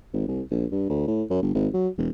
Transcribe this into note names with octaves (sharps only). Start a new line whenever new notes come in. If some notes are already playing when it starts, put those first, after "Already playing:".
G#1
C2
A#1
G2
D2
A2
F#2
G1
G#1
F#3
E1